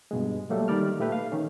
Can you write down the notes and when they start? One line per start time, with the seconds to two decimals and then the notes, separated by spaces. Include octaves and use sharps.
0.11 G2 B2 G#3
0.50 F#3 G3 A3 A#3
0.68 D#3 G3 D5 F6
1.00 A#2 A3 G4 B4
1.12 F5
1.32 D#3 C#4